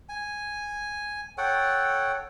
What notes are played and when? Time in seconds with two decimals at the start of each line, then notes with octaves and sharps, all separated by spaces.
0.09 G#5
1.38 A4 C#5 F#5 G5